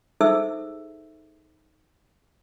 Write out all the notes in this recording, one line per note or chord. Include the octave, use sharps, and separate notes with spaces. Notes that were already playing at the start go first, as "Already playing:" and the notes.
D#4 G#4 A4 C5 E5 E6